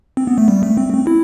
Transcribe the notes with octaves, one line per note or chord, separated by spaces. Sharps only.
C4
B3
A3
G3
A3
C4
C4
E4